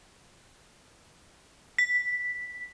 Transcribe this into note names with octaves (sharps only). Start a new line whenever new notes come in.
B6